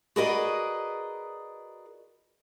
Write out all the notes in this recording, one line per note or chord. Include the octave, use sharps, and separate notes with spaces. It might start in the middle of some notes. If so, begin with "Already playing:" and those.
F#4 G#4 A#4 B4 D5 D#5